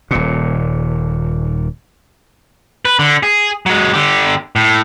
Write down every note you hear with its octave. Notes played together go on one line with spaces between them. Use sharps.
D#1 A#2
B4
D3
G#4
F#3 G#3
D3 G4
A2